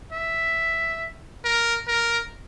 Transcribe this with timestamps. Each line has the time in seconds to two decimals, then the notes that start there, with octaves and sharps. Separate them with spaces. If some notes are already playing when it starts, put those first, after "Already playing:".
0.12 E5
1.44 A#4
1.87 A#4